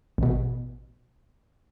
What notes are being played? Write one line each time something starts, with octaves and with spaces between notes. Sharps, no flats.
A1 B2